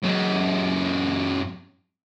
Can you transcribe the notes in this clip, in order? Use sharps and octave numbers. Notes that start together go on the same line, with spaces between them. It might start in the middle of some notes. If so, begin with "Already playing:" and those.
F#2 G#3